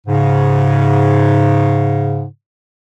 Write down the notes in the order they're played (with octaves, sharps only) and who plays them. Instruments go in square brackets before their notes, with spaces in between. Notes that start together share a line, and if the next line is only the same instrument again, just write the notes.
[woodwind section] G#2 C#3